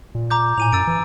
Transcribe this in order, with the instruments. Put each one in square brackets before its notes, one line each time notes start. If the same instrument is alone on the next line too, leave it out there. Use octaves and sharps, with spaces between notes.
[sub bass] A#2
[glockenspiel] A#5 D6 G6
[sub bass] A2 [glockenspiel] G#5 D#7 F7
[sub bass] F#2 [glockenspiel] E6 A6 D7
[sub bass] E3